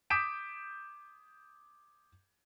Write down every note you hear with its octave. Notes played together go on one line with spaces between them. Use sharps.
D6 D#6 G6 B6 D7 E7